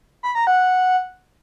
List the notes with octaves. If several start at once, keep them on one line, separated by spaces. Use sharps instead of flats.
B5
A#5
F#5